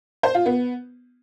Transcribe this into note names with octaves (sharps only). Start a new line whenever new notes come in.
C5
F4
B3